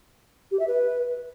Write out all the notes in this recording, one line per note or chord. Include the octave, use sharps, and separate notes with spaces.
G4
E5
B4